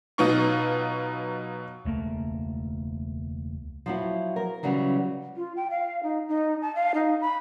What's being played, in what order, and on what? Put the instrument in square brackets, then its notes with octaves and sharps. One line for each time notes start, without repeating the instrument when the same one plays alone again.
[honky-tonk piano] B2 F#3 B3 D#4 F4 C#6
[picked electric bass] E1 C#2 A3 A#3
[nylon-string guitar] F3 F#3 E4
A#4
C#3 E3 F#3 G3
[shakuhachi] F4
G5
F5
D#4
D#4
A5
F5
D#4
B5